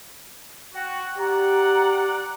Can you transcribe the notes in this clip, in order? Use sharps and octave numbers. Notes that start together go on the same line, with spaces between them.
F#4 G5
G4 D5 F#5 A#5